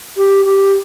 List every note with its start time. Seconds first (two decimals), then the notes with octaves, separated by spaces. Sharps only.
0.17 G4
0.46 G4